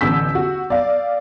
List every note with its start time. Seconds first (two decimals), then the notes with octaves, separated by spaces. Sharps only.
0.01 A1 D3 E6 G6 B6
0.35 F#4
0.70 D5 F5